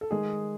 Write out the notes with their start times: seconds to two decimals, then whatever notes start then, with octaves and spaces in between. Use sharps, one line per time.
0.01 A4
0.11 D#3 G#3 G#4